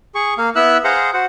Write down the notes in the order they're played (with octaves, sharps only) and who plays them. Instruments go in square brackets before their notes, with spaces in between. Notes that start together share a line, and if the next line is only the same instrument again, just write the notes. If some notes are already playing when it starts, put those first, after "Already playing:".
[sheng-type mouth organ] G#4 C#6
A#3 F5
B3 E4 E5 E6 F#6
G#4 C5 F5 F#5 A#5 C6
F#4 C5 F#5